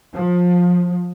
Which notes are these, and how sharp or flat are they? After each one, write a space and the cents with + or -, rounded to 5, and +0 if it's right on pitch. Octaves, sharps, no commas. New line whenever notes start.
F3 +25